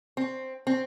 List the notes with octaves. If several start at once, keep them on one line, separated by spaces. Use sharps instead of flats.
C4
C4